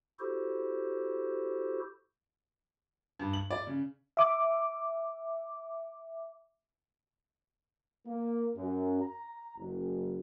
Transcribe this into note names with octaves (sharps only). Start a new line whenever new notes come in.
E4 F#4 G4 A4 C5
G2
F#7
D5
C#3
E5 D6
A#3
F#2
A#5
F#1